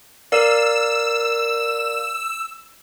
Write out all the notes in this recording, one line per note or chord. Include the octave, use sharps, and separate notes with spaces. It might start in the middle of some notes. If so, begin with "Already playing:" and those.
A#4 D5 F5 E6